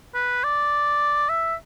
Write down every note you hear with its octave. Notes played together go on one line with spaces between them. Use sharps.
B4
D5
E5